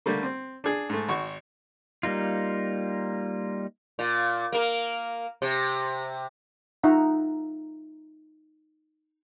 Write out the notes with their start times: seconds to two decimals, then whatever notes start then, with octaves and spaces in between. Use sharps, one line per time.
0.06 D3 G3 A3 A#3
0.23 C4
0.64 D4 G#4
0.89 G#2 A3
1.09 G#1 F#4 C#6
2.03 G3 A#3 D#4 F4
3.99 A#2
4.52 A#3 A#4
5.42 C3
6.83 D#4 F4 E5 F#5 A#5